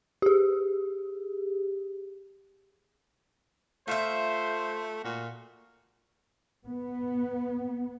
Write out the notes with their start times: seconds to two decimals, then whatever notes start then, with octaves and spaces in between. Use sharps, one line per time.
0.22 G4 G#4
3.88 A3 F4 C5 E5
5.04 A#2 F#4
6.68 B3